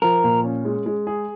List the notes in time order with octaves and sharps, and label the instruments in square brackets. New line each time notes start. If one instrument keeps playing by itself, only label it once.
[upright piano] F3 [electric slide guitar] A#4
[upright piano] A#2
C#4
G#3
G#3
G#4